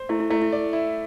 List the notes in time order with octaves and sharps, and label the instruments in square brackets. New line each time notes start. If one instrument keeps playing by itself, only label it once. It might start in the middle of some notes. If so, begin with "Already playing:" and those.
Already playing: [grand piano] C5
[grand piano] A3 [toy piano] E4
[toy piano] E4
[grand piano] A3 [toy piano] E4
[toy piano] E4
[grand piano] D5
E4